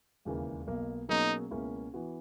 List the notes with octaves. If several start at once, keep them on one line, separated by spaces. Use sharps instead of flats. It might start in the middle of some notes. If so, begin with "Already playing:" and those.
E1 D#2 C#3 E3 A#3
B1 B2 A#3
B2 F#3 A#3 C#4 D#4 G#4
C#2 B2 A#3 C#4 E4
E3 B3 F#4